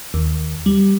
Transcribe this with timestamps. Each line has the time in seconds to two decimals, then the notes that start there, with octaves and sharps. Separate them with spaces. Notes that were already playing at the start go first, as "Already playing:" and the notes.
0.14 D#2
0.66 G3